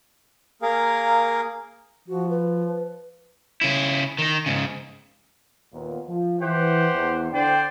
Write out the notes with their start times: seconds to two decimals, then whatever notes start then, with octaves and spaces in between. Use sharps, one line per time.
0.62 A#3 G#4 A#4 F5
2.08 F3 F#4
2.29 B4
3.61 C#3 E4
4.19 D#3 D#4
4.46 G#2 C#3
5.73 D#2 A#2 B3
6.08 F3
6.40 E3 G4 C5 F#5
6.94 E2
7.33 D3 C5 D5 G5